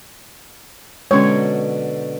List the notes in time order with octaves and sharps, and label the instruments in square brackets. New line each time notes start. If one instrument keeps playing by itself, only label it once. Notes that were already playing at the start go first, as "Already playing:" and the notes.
[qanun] B2 D3 F#3 [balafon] G#3 C#4 [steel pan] C#5